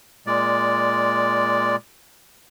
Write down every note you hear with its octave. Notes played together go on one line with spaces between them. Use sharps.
A#2 G#3 D5